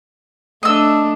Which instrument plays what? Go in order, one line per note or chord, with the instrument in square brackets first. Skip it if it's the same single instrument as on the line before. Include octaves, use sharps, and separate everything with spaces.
[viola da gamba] A3 D4 [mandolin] D#5 E6